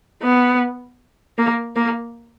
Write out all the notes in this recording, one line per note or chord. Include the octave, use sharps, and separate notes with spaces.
B3
A#3
A#3